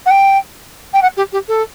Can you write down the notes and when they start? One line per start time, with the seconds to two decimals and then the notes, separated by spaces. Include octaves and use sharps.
0.06 F#5
0.10 G5
0.93 G5
1.02 F#5
1.17 G4
1.32 G4
1.48 A4